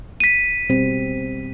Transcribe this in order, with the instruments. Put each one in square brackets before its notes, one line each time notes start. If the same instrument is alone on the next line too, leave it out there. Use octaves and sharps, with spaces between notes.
[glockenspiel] B6 D#7
[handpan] B2 G3 C4